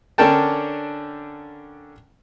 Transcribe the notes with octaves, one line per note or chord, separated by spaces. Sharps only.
D3 C#4 D4 A#4 G5 A5